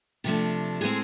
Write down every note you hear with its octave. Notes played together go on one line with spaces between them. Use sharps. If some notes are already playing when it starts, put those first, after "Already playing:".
C3 F3 A3 D4
A2 G#3 C4 G#4